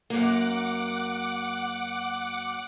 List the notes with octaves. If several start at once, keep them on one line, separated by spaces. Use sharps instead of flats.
F#2 A#3 F#5 D6